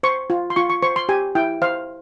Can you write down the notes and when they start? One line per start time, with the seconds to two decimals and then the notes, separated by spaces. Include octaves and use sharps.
0.03 C5 C#6
0.30 F4
0.50 C6
0.56 F4 C#6
0.70 C#6
0.83 C5 C#6
0.96 C6
1.09 G4 G#5
1.35 E4 G5
1.62 C5 F5